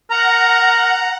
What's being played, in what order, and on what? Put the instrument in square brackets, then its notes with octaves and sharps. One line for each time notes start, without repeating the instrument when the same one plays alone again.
[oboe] A#4 [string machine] F#5 [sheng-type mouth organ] A#5